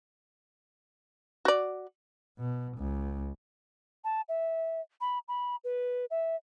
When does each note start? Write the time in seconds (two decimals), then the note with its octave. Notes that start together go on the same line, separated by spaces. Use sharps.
1.45 F#4 D5
2.39 B2
2.78 C#2
4.04 A5
4.29 E5
5.01 B5
5.28 B5
5.64 B4
6.11 E5